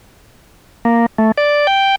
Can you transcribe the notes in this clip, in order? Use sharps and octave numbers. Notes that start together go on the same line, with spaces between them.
A#3
A3
D5
G5